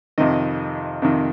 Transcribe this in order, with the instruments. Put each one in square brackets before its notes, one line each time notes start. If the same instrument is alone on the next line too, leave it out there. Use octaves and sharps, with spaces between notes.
[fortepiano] F2 C3 D#3 D#5
F2 C3 D#3